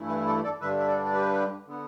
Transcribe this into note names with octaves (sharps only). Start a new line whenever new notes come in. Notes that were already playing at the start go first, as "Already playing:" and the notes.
Already playing: G2 E3 A3 E4
B4 E5
A4 D5
A4 D5
G2 D3 G3 D4 B4 E5
E5
A4 D5
D5
G4 B4
D3 B3